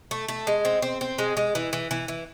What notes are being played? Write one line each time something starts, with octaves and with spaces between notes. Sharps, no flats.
A3
A3
G#3
C4
C4
C4
G#3
G#3
E3
E3
E3
E3